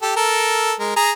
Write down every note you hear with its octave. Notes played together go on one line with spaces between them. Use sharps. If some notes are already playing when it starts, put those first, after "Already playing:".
G4 A4
A4 A#4
G#3 A#4
G#4 A#5